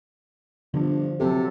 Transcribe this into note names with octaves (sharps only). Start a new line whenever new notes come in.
G1 D3 F3 D4
C3 F#3 C4 A4